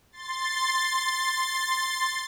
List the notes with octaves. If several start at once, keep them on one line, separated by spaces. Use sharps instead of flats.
C6 A6